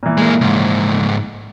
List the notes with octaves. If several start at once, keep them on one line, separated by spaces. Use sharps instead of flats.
A#2 E3
G#3 A#3
C#2 G#2